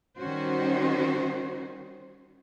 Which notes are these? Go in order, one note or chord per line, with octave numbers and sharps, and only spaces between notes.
D#3 G3 C#4 F#4 C5